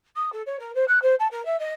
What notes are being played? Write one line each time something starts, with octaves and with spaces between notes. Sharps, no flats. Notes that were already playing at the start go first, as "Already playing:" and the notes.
D#6
A4
C#5
A#4
C5
F#6
C5
A5
A#4
E5
D#5